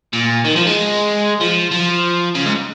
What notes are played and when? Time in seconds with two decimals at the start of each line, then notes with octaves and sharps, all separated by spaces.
0.13 A#2
0.45 D#3
0.56 F3
0.67 G#3
1.41 F3
1.71 F3
2.35 C#3
2.46 G#2